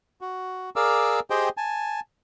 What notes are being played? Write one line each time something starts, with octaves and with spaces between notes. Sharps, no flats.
F#4
G#4 A#4 D5 F5 D6 E6
G4 G#4 C5 D#5 G5
G#5 A5